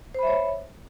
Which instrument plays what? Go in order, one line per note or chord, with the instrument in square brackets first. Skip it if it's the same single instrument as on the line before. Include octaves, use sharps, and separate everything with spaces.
[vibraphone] C5
B5
E5
C#5